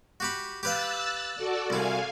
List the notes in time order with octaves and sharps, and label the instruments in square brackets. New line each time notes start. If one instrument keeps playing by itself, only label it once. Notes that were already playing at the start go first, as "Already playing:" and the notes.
[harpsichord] F#4 G4 B5
[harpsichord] G4 B4 F5 [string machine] E6 F#6 A6
[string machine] F#4 A4 D5
[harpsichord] C2 E4 [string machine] F5 G#5